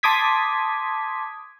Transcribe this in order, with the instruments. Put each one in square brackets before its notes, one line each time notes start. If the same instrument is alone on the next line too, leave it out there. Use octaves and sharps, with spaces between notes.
[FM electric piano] A5 C6 D6 D#6 G#6 B6